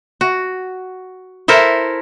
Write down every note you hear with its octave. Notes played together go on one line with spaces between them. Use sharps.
F#4
E4 A4 A#4 C5